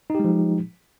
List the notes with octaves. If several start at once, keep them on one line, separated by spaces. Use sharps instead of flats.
F3 G#3 D#4 G4